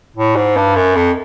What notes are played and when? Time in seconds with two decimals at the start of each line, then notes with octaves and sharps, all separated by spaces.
0.16 A2
0.36 G#2
0.56 G2
0.76 F#2
0.95 F2